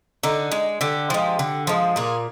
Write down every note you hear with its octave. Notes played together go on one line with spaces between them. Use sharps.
D3 D#4
G#3
D3 G4
F3 G#3
D3
F3 G#3
A#2 G#4